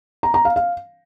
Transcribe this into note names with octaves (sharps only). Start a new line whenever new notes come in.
A#5
A#5
F5
F5